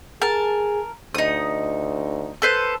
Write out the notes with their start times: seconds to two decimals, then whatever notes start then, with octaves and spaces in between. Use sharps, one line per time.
0.22 G#4 A#4 A5
1.15 D2 D#4 D#6
2.42 A4 B4 C5